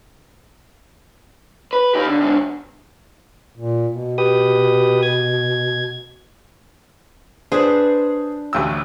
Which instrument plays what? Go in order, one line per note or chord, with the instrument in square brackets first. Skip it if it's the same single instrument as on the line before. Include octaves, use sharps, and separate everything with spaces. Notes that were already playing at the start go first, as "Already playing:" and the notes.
[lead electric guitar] B4
D#4 G4
D3
G#2 D3
[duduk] A#2
B2
[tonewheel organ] G4 B4 D#6
G#6
[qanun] D4 B4 [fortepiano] G#4 C5
[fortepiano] A1 D2 E6